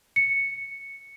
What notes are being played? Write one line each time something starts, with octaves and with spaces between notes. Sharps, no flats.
C#7